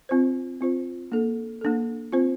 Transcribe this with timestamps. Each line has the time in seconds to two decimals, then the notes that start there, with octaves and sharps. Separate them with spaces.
0.09 C4 F4 C5
0.61 C4 F4 C5
1.12 A#3 D4 A4
1.61 A#3 D4 A4
2.12 C4 F4 C5